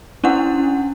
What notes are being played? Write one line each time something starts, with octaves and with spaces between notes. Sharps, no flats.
C#4 D4 E4 F#5